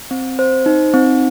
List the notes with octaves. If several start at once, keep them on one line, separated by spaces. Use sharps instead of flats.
C4
C5
D#4
C4